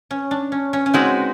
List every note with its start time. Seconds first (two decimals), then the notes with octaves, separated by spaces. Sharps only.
0.11 C#4
0.31 D4
0.52 C#4
0.73 C#4
0.86 C#4
0.93 G#3 B3 C4 D#4 F#4